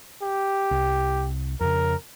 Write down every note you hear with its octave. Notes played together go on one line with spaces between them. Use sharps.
G4
C2
F2 C#3 A#4